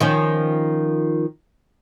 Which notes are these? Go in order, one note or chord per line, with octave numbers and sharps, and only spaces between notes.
D#3 F3 C#4